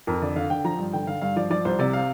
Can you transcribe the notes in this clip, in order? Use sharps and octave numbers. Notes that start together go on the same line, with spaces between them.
F2 A#4
D3 D5
D3 F5
D3 G5
F3 A#5
G2
D3 G5
D3 F5
G2 F5
F3 D5
F3 D5
C2 C5
C3 D5
F5